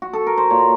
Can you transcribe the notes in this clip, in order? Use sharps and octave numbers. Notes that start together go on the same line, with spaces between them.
F#4
A4
A#4
C5
A#2 C#5